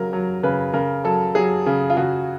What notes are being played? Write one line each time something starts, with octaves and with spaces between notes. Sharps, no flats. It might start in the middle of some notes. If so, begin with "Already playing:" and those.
Already playing: C#3 F#3 A#4
F#3
C#3 B4
C#3 A#4
F#3 A4
F#3 G#4
C#3
F4
C#3 F#4